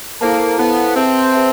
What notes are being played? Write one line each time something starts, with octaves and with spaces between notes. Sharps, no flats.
A#3 E4 A4 C5 F5 A5
B3 E4 A4 C5 F5 A5
C4 G#4 B4 E5 A5
G#4 B4 E5 A5